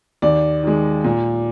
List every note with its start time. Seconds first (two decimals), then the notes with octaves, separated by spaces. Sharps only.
0.22 D#2 D5
0.63 D#3 G#3
1.04 A#2